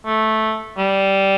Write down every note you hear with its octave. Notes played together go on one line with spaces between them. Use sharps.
A3
G3